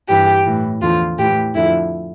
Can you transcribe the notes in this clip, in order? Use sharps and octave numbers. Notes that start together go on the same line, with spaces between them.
G2 E3 G4
A2 E3
E2 D3 F3 F4
A2 E3 G4
F2 D3 F3 E4